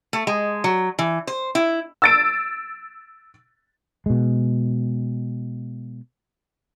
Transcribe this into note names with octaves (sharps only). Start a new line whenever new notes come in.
A3
G#3
F#3
E3
C5
E4
E6 A6 D7
B2 G#3